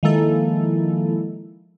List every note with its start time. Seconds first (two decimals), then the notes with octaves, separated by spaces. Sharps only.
0.03 D#3 F3 G#3 A#3 E4 A4